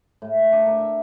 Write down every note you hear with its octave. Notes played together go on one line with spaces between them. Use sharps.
A2
D4
A#4
E5